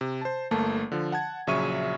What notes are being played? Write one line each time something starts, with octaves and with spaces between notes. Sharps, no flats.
C3
C5 A5
G1 A3 A#3 A5
D3 F3
F#5 A5 G#6
A#1 C#3 F#3 E5 C#6 D#7